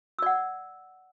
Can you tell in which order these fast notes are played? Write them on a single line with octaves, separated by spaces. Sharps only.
E6 D5 F#5